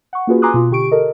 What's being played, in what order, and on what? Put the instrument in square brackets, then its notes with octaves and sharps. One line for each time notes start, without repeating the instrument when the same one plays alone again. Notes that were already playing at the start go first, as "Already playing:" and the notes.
[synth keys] F#5 C#6
A#3 C#4 F4 F#4 G#4 B4
G#5 A#5 C6 D6 D#6 F#6
B2 F4
D3 G4 C#6 D7
A4 A#4 D#5